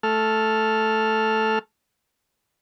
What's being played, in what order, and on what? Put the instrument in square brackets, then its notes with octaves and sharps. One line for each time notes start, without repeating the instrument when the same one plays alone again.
[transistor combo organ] A3 A4 F6